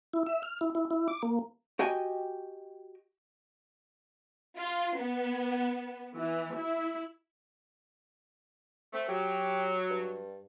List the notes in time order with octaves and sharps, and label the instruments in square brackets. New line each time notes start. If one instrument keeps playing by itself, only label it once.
[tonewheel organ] E4
E5
F6
E4
E4
E4
D6
A#3
[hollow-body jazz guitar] F#4 G4 D#5 G5 G#5
[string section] F4
B3
E3
E4
[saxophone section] A3 [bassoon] C4
[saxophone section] F#3 [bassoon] G4
[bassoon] G2